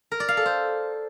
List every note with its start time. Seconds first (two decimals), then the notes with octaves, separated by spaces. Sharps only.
0.12 A#4
0.20 D5
0.29 F5
0.37 A4
0.46 C5